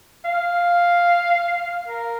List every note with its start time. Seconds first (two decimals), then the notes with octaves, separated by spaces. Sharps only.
0.25 F5
1.88 A#4